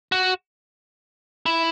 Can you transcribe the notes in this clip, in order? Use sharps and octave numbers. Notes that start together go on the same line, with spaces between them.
F#4
E4